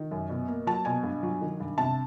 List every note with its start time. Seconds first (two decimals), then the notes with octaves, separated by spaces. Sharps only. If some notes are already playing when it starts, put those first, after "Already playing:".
Already playing: D#3
0.11 F#2
0.29 B2
0.48 A#3
0.67 F#3 A5
0.85 B2 G#5
1.03 G2
1.23 F#3
1.41 D#3
1.60 G2
1.77 C3 A5